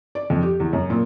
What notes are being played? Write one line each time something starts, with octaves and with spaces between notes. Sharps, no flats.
D5
F2
G4
E2
F#2
A#2